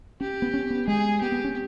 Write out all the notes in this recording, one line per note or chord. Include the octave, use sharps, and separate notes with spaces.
C#4 G4
B3
C#4
B3
G#3 G#4
B3 G4
B3
C#4